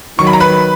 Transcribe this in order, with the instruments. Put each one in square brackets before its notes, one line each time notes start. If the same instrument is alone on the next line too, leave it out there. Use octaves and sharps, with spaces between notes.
[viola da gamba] D#3 F#3 [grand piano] C#6
[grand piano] B5
A#5
B4 B5